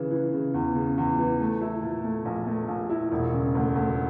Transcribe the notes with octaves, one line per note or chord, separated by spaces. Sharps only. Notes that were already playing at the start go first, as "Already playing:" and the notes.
Already playing: C#3 E3
E3
C#3
E2
C#3
E2
E3
A3
E4
A#2
A3
A#1
A3
A#1
E4
E1
C#3
D2
D2